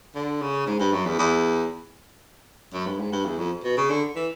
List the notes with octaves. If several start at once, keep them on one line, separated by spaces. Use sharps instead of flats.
D3
C#3
G#2
G2
F#2
E2
E2
F#2
G2
G#2
G2
E2
F2
B2
C#3
D3
E3